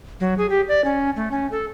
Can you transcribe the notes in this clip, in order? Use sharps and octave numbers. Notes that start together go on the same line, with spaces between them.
F#3
G#4
G4
D5
C#4
A3
C#4
A4